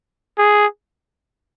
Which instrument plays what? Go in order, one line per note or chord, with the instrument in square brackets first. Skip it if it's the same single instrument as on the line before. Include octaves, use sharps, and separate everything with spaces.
[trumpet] G#4